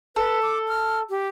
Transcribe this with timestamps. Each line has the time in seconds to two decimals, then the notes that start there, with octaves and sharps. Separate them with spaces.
0.16 A4 B4
0.42 D6
0.68 F6
1.10 G4